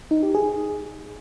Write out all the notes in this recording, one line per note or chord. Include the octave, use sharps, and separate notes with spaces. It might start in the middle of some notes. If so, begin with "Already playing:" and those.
D#4
G4
G#4